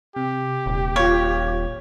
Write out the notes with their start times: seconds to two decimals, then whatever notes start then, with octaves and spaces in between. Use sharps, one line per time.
0.16 C3 G4
0.66 D#1
0.96 F4 C#5 F5